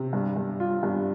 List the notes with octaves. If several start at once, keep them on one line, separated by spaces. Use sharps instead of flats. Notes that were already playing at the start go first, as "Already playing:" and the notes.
Already playing: C3
G2
G2
F4
G2